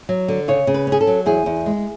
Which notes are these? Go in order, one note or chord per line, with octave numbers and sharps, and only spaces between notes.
F#3
D3
C#3 C#5
C#3
B4
C#4
G#4
A4
F#3
E2 G#4
E2
G#3